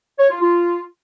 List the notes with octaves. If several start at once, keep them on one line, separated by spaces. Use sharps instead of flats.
C#5
F4
F4